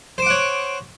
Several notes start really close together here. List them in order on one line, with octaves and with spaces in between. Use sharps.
C5 D6 F#5 C#5